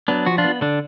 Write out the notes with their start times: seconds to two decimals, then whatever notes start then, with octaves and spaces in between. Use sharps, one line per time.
0.08 F#3 B3 D4
0.26 F3 F#4
0.38 D4 F4
0.44 B3
0.61 D3 D4